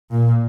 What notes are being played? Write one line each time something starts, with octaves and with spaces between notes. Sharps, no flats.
A#2